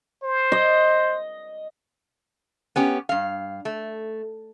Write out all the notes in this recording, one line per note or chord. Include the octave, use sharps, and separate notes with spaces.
C5
D#5
B3 C#4 G4
G2 F5
A3